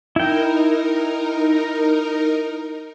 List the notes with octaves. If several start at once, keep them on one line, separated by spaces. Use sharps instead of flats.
D#4 E4 A#4 G5